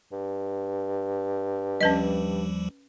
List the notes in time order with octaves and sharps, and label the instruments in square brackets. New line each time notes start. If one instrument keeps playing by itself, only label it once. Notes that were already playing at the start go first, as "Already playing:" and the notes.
[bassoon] G2
[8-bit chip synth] D#2 F3 G3 [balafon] C#4 B4 D#5